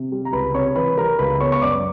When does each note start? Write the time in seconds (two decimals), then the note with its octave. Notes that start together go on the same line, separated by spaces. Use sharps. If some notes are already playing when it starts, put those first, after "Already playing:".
Already playing: C3
0.12 G3
0.25 A#5
0.33 C#2 B4 B5
0.54 C3 C#5 C#6
0.76 E3 B4 B5
0.97 G3 A#4 A#5
1.19 C#2 B4 B5
1.40 B3 C#5 C#6
1.52 C#6
1.62 F#2 D5 D6